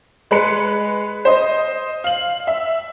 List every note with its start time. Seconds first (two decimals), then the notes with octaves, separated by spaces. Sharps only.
0.31 G#3 B4 C#7
1.25 C5 D#5
2.04 F5 F#7
2.47 E5